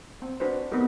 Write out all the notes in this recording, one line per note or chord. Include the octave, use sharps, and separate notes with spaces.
C4
D4 F#4 B4 C5
B3 C4 D#4 G4 A#4